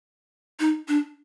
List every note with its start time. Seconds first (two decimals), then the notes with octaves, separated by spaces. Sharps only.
0.60 D#4
0.88 D4